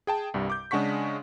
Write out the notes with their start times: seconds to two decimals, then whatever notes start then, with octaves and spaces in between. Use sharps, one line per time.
0.07 G#4 G5 A5
0.34 C2 G2 G3
0.50 D6 G6
0.71 C#3 G#3 D4 F#5 C#6 B6